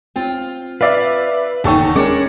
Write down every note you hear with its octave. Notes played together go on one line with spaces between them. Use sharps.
C4 F4 G5
B4 D5 E5 F5
D#1 E2 C#3 D#4 A4 G5 C#6
G#3 C#4 D4 A#4 C#5 D6